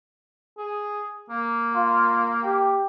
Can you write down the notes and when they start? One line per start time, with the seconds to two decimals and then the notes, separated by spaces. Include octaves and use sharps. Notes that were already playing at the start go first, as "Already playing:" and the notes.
0.58 G#4
1.30 A#3
1.75 F4
2.44 G4